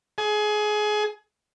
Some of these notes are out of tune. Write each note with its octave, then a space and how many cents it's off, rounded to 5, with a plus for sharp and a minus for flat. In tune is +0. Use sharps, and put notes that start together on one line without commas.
G#4 +25